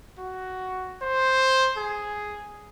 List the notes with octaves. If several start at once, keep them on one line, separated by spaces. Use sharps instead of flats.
F#4
C5
G#4